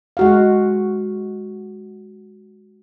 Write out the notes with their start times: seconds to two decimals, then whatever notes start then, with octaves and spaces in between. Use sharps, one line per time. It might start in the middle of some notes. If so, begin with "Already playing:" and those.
0.17 G#3 F#4 F5